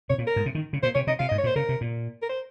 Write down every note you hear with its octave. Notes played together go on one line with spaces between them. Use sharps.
C3 C#5
A#2
A#4
G#2
C3
D#3
C#3
A#2 C5
C3 C#5
C3 D#5
C3 F5
D#5
G#2
C#5
A#2
C5
C#3 A#4
C3
A#2
A#4
C5